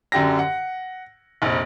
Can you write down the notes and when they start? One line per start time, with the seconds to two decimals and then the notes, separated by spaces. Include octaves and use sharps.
0.12 F#2 D3 G4 A#6
0.39 F#5
1.42 F1 A#1